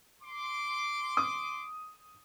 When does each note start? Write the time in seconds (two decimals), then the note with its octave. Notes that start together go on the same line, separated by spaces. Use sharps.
0.22 C6 D6
1.17 D#6